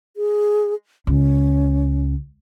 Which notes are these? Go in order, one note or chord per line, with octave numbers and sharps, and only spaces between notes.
G#4
C#2 C#4